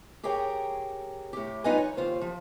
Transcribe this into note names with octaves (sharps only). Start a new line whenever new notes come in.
G4 G#4 A#4 C#5 G5
A2 G4
G3 D#4 F4 B4 D#5 G#5
C#5
D#2 F4 C5
F3